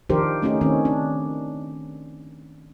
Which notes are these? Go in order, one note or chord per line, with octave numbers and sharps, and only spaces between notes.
D#3 F3 D4 G4 A#4 C5
A3 C#4 D#4 G4
D#3 C4 C#4
D4